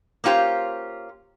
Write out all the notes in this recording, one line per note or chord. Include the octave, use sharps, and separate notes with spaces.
A#3 C#4 F4 G4 C5